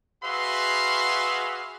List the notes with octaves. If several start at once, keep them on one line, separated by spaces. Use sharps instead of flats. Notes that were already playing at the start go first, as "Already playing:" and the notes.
F#4 G#4 B4 E5 F5 C6